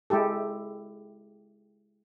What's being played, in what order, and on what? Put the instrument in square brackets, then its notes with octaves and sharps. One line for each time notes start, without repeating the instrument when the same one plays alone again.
[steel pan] G#3 E4 G4 A4